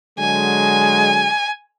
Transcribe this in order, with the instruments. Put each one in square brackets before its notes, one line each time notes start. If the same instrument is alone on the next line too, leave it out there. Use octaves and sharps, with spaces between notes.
[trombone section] D3 F#3 G#3 [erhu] G#5